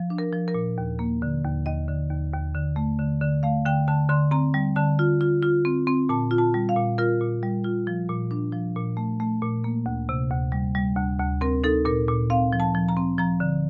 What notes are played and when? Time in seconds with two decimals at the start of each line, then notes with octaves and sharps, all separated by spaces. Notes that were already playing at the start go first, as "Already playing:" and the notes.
Already playing: F3
0.10 D4
0.18 A#4
0.32 F3
0.48 A#4
0.54 A#2
0.78 D#2
0.99 A#3
1.22 D3
1.44 D#2
1.66 D#2 D#5
1.88 D3
2.10 D#2
2.33 D#2
2.55 D3
2.76 A3
2.99 D3
3.22 D3
3.43 A3 F5
3.66 D3 G5
3.88 D3 A5
4.09 D3 C6
4.31 C4 A#5
4.54 G3
4.76 D3 A5
4.99 F4
5.21 F4
5.43 F4
5.65 C4
5.87 C4
6.09 A#2 A5
6.31 F4
6.38 A5
6.54 G3
6.69 F5
6.76 A#2
6.98 F4 A#4
7.21 A#2
7.43 G3
7.64 F4
7.87 F3
8.09 A#2
8.31 D4
8.53 F3
8.76 A#2
8.97 A3
9.20 A3
9.42 A#2
9.64 A#3
9.86 D2
10.09 C3
10.30 D2
10.52 G3
10.75 G3
10.97 D2
11.19 D2
11.41 C4 A#4
11.64 D#4 A4
11.85 A#2 A#4
12.08 A#2
12.30 C4 F5
12.53 F3
12.60 A5
12.75 F3
12.89 A#5
12.97 C4
13.18 F3 A#5
13.40 D3